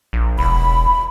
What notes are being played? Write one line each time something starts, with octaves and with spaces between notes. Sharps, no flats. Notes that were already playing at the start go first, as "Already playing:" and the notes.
A#1
E1 B5